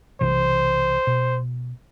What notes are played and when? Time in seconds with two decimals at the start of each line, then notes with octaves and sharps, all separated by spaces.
0.21 B1 C3 E3 C5
1.07 B2